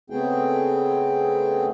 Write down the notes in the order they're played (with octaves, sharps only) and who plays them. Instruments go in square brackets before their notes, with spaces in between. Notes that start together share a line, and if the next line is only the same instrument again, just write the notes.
[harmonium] C#3 A3 B3 C4 G#4 G5